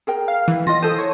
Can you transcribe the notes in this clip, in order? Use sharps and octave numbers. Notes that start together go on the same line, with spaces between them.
G#4 A#4 G5
F5
E3
F4 D#5 A#6
E4 A4 C5 D#6
C#5